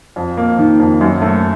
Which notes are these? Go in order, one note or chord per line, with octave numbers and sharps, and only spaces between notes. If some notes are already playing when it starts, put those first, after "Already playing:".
F2
A#3
D#3
F2
F#2
A3